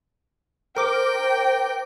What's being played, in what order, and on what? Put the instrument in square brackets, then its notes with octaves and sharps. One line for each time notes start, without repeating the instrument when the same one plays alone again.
[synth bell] A#4 D6 [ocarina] C5 [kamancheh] G5